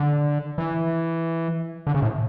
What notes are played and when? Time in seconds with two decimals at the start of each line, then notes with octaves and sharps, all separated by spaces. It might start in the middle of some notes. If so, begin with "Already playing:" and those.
Already playing: D3
0.58 E3
1.87 D3
1.95 C#3
2.02 A2